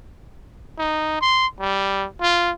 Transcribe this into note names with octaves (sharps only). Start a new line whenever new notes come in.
D#4
C6
G3
F4